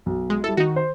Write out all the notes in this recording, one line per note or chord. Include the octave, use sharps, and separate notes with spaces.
B1
G#3
G3 E4 A4
D#3 D#4 F#4
C5